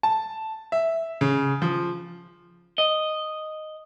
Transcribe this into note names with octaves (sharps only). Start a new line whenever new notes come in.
A5
E5
C#3
F3
D#5